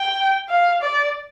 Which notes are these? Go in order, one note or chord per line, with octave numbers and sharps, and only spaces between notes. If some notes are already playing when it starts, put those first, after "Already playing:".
Already playing: G5
F5
D5